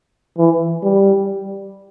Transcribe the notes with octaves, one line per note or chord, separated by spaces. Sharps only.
E3
G3